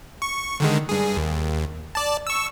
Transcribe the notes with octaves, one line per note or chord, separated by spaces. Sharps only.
C#6
D3 D#3 G#3
G2 G#4
D#2
D5 A5
C#6 E6